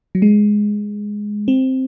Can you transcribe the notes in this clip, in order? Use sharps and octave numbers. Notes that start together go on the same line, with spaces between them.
F#3
G#3
C4